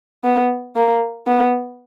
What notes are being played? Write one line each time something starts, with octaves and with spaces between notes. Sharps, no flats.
B3
A#3
B3